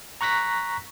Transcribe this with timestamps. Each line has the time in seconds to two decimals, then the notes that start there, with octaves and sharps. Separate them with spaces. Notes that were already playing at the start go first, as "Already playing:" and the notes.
0.21 A#5 C#6 F#6 A#6 B6